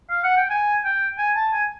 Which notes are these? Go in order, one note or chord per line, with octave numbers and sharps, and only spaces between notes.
F5
F#5
G5
G#5
G5
G#5
A5
G#5